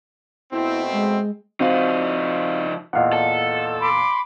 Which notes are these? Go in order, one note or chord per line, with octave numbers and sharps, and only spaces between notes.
B2 A3 C4 E4
G#3
F3 C4 D#4 F#4 C5 F5
E2 A#2 D#5 F5 F#5
A4
B5 C6 D6